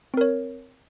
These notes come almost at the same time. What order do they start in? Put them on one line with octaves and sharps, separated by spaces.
C4 A#4 C#5